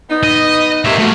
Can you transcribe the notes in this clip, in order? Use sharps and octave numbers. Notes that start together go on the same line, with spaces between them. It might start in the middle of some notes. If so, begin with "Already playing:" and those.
B3 D#4
D#5
C3 A#3 C#5 E5
A3 A#3 F#4